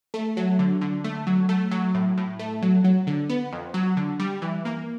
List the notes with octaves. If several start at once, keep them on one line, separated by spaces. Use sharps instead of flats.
A3
F#3
D3
D3
A3
F#3
A3
F#3
A2
A2
A3
F#3
F#3
D3
B3
F2
F#3
D3
G3
E3
A#3